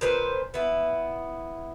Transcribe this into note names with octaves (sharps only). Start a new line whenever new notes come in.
A#2 C4 B4 C5
B3 E4